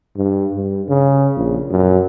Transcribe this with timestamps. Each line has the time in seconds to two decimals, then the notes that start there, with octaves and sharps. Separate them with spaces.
0.17 G2
0.55 G2
0.89 C#3
1.36 A#1
1.70 F#2